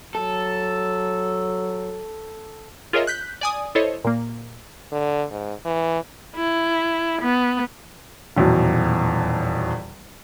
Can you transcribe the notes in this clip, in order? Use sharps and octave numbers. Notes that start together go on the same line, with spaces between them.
F#3 A4
F4 G#4 A#4 C#5 D#5 E5
F#6 G6 B6
D5 G#5 D#6
E4 A4 C5 C#5 D#5
A#2 A#3
D3
G#2
E3
E4
B3
D#1 E2 B2 F#3